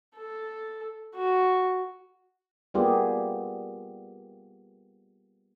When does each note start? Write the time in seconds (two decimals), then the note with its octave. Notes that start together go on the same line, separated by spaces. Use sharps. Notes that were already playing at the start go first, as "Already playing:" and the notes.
0.16 A4
1.16 F#4
2.74 G3 A#3 B3 F4 G4 G#4